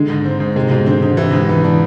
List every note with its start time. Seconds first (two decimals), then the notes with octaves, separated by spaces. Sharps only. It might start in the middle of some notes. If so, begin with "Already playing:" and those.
Already playing: D3 G#3
0.10 G#2
0.25 C4
0.40 G#2
0.56 C3 G#3
0.71 G#2 B2
0.86 D3 C4
1.02 G#2 D3
1.17 C3 E3
1.33 G#2 D3
1.48 E3 B3
1.64 E3 D4